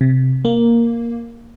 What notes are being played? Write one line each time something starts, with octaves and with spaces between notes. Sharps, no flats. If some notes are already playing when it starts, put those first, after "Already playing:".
C3
A#3